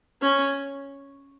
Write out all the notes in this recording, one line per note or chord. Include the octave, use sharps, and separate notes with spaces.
C#4